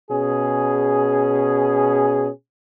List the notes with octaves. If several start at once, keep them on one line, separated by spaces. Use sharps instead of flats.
B2 C#4 G#4